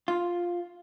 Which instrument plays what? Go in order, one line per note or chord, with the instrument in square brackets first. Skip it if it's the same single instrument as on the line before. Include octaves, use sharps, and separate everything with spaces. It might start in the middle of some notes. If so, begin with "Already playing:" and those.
[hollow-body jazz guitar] F4